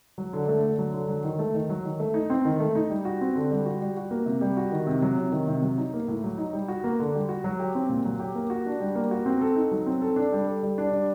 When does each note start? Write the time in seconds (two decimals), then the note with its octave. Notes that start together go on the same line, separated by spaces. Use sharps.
0.18 F#3
0.33 D3
0.48 A3
0.63 D3
0.78 F#3
0.94 D3
1.09 F#3
1.24 D#3
1.39 A3
1.54 D#3
1.70 F#3
1.85 D#3
2.00 A3
2.14 D#4
2.30 C4
2.45 D#3
2.60 A3
2.75 D#4
2.90 G3
3.05 F#4
3.21 C4
3.35 D3
3.51 G3
3.66 F#4
3.81 G3
3.97 F#4
4.11 A#3
4.26 C3
4.41 G3
4.57 F#4
4.72 D#3
4.87 C3
5.02 F#3
5.18 C3
5.32 D#3
5.48 C3
5.62 F#3
5.78 D#4
5.94 A#3
6.08 A2
6.24 F#3
6.38 D#4
6.53 G3
6.68 F#4
6.84 A#3
7.00 D3
7.15 G3
7.29 F#4
7.44 F#3
7.59 G4
7.75 C4
7.89 A#2
8.05 F#3
8.19 G4
8.35 A#3
8.50 F#4
8.66 D4
8.80 G3
8.95 A#3
9.11 F#4
9.26 C4
9.41 A4
9.56 D#4
9.71 F#3
9.86 C4
10.02 A4
10.16 D4
10.32 G3
10.46 A4
10.63 G3
10.78 D4
10.92 G3